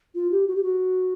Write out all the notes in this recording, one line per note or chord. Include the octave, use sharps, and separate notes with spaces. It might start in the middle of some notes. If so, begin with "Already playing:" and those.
F4
G4
F#4
G4
F#4